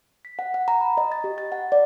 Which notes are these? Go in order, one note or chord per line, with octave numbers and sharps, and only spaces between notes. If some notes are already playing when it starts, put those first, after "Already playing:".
B6
F#5
F#5
A#5
B5
D#5
A6
G4
A6
F#5
D5